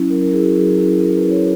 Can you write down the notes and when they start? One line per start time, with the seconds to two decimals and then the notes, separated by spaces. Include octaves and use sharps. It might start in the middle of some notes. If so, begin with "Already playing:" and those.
Already playing: F#3 C#4 E4
0.10 F#3 A#4
0.22 A#4
0.33 C#4 E4 G#4
0.44 F#4
0.56 F#3 G#4
0.78 C#4 E4
1.00 F#3 A#4
1.15 B4
1.22 C#4 E4
1.30 C#5